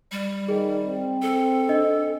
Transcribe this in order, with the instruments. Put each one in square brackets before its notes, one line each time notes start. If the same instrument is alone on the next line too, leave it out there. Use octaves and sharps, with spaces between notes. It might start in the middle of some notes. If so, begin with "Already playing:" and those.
[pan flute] G3
[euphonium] D#3 [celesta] G#4
[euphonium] C4
[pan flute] A4
[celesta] D4 D#5